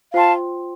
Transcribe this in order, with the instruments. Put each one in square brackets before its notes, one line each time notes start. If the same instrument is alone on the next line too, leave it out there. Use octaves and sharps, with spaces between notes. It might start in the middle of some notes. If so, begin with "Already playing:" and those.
[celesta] F4 C5 G5 C6 [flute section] F5 A5